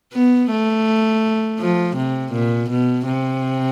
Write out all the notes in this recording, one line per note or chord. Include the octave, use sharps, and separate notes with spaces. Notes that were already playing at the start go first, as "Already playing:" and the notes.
B3
A3
F3
C3
A#2
B2
C3